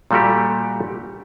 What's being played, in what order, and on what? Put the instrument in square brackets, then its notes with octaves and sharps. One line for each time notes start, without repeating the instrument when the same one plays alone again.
[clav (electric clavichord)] A#2 G3 A3 F#4 G4